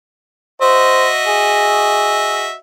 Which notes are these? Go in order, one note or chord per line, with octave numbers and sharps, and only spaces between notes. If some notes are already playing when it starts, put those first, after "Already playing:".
F#4 C5 D#5 E5
G#4